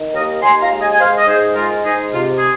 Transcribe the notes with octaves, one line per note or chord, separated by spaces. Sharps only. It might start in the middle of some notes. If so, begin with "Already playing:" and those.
Already playing: D#3
D#2 A#4 D#5
D#2 G#5 C6
F5 A#5
G#3
D#5 G#5
G#5
G#3 C5 F5
D#5
G#2 G#4 C5
G#3 F4 A#4
G#2 D#4 G#4
C3 F4
G#4